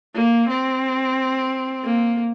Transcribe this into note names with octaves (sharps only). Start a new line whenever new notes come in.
A#3
C4
A#3